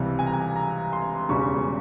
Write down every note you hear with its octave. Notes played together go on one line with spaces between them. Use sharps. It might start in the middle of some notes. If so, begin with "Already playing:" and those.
Already playing: C#2 C3 E3 G3
G#5
A#5
G#5
A#5
C6
E1 E2 C#3 G3 C#6